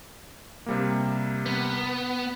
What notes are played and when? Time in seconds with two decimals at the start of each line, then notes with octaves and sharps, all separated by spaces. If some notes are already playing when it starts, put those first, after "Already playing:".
0.66 C3 G3 A#3
1.46 B3